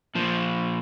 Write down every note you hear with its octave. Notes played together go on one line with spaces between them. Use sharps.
A#2 F3